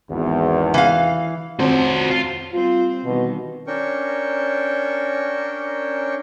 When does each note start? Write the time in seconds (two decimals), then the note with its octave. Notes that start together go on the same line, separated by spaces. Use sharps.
0.10 G#1 E2
0.74 E3 F5
1.59 F2 C4 F#4 C5 C#5
2.11 F4
2.53 G3 C4 F4 C5
3.05 B2 D#3 E3 G3
3.67 C#4 D4 A#4 G5 C#6